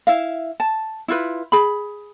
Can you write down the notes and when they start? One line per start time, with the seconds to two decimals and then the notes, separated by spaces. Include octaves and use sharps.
0.07 E4 E5 F5
0.60 A5
1.08 E4 F4 B4
1.52 G#4 B5